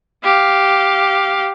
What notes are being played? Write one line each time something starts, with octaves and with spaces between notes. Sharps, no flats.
G4 F5